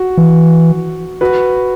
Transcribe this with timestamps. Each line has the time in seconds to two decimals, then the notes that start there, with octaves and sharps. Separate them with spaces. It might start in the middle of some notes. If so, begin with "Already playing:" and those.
Already playing: F#4
0.17 E3
1.21 F#4 B4